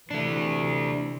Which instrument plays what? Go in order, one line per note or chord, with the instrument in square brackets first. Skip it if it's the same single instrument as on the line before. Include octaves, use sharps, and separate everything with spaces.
[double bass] C3 E3 [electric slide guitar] A3 D4